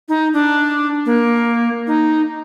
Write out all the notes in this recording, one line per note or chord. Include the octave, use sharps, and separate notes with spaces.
D#4
D4
A#3
D#4